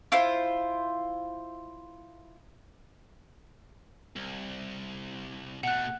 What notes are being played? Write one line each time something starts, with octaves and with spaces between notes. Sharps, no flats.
E4 F4 C5
C2
B2 A3 F#5 F#6